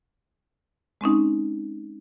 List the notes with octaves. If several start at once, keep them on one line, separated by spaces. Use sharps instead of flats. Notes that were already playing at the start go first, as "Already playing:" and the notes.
G#3 C4 C#4 D#4